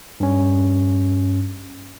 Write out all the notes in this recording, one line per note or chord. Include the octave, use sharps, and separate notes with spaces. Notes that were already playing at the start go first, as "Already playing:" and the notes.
G2 C#4